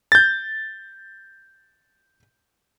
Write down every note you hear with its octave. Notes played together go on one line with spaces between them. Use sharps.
G6 A6